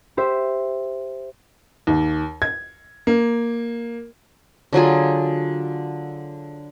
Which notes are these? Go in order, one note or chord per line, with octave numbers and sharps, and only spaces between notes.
G4 C5 E5
D#2
G#6
A#3
D3 F#3 F4 G#4